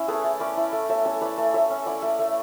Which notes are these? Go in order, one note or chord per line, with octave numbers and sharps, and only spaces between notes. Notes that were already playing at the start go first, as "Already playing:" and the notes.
Already playing: C#4 E4 C#5 E5
A3 G#4 B4
A3
C#4 B4 D5
E4
A3
A3 C#5 E5
C#4 A4 C#5
E4 B4 D5
A3
A3 C#5 E5
C#4
E4 D5 F#5
A3
A3